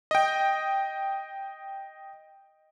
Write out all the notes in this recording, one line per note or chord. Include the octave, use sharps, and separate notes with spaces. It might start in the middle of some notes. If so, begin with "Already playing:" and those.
D#5 G5